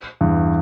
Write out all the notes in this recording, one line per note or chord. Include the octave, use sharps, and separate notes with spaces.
E2 G2